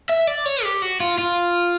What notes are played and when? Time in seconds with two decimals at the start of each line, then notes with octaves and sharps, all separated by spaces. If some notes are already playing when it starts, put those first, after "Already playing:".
0.09 E5
0.27 D5
0.45 C#5
0.64 G4
0.82 F#4
1.00 F4
1.18 F4